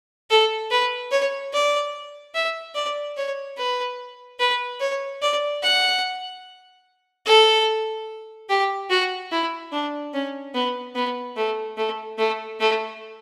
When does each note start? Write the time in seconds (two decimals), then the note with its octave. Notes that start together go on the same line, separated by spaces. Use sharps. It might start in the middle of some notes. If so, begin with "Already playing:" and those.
0.30 A4
0.71 B4
1.11 C#5
1.53 D5
2.34 E5
2.75 D5
3.17 C#5
3.57 B4
4.39 B4
4.80 C#5
5.22 D5
5.63 F#5
7.26 A4
8.49 G4
8.90 F#4
9.32 E4
9.72 D4
10.14 C#4
10.54 B3
10.95 B3
11.37 A3
11.77 A3
12.18 A3
12.60 A3